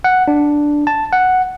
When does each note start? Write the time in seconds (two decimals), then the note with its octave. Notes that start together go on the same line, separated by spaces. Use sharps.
0.04 F#5
0.28 D4
0.87 A5
1.13 F#5